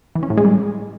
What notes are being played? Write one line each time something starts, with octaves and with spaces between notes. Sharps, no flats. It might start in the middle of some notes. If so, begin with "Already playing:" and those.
E3
C#4
A2
G#3
G3